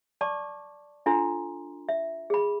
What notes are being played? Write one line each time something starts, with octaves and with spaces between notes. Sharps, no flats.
D5 A5 C#6 D6
D4 F4 A4 A#5 C6
E5
G#4 B5